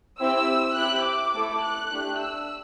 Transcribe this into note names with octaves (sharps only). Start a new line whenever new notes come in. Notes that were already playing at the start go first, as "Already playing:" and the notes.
C4 E4 G4 E6
C4 E4 G4 F#6
D6
A3 E4 A4
F#6
A3 D4 G4
E6